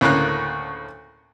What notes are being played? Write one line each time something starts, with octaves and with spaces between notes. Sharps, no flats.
D2 A2 C#3 A#3 F#6